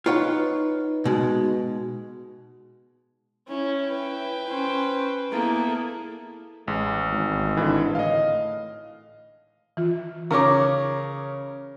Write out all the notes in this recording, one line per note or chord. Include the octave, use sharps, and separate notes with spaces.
D#4 F4 B4 C#5 F#5
B2 G#3
C#4 E4
B4 G5
C#4 C5
A#3 B3 E4 G#4 A4
A1 G#3
G#1
D3 E3
A2 D#5 F5
E3 F4
C#3 A#4 C#5 A#5 C#6 D6